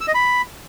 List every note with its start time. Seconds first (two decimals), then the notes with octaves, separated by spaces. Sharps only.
0.01 E6
0.08 D#5
0.14 B5